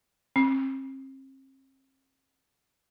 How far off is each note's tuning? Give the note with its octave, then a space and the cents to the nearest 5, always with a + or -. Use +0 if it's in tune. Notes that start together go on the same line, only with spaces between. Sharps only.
C4 +40